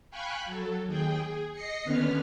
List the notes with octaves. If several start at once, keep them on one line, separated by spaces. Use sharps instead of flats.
F5 G5 G#5 B5 C#6 F#6
F#3 A4
D#2 G#4 G5
G#4
D#5 A#6 C7 C#7
D#2 D3 B3 C#4 B4 F6